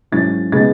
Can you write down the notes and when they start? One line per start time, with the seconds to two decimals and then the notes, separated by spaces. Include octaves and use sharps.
0.12 G#2 F#3 C#4 E4 A6
0.52 C#3 G#3 B3 D#4 A6